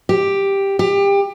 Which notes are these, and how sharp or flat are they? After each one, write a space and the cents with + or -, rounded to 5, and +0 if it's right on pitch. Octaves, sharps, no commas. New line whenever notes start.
G4 +5
G4 +25